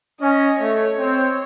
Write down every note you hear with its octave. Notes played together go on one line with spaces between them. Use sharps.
C#4 D#5
A3 C#5
C4